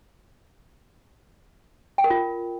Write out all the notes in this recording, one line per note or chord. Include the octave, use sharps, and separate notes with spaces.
G5
A#4
F4